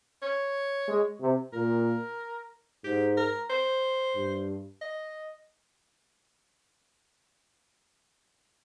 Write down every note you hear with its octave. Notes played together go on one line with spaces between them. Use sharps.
C#5
G#3
C3
A#2 A#4
G#2 G4
A#4
C5
G2
D#5